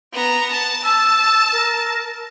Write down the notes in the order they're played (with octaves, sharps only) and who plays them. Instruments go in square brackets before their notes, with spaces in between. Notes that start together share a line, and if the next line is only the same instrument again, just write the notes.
[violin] B3 A#5
A5
[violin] A5 [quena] E6
[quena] A#4